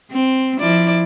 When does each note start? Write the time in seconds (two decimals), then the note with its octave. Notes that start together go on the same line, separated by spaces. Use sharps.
0.11 C4
0.60 F3 E4 D5